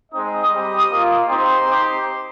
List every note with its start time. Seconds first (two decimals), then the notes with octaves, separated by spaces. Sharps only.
0.11 G#3 C4 D#4 D#5 D#6
0.50 G3 C4 G4
0.89 A#3 F4
1.27 C4 D#4 G4 C5 C6
1.66 C4 D#4 G4